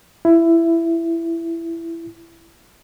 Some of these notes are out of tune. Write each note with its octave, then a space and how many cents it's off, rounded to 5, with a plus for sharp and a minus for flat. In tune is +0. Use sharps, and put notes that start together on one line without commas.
E4 +15